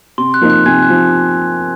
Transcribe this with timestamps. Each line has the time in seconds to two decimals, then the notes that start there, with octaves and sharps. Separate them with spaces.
0.18 C3 C6
0.34 F#6
0.41 F3 A#3 D#4
0.50 F#6
0.66 C3 G#5 G#6
0.83 F#6
0.90 F3